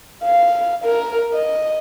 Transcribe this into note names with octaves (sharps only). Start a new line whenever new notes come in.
F5
A#4
D#5